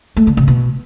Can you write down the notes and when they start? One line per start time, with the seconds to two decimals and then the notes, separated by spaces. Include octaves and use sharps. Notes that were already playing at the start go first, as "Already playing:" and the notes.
0.17 A3
0.27 D3
0.37 C3
0.48 B2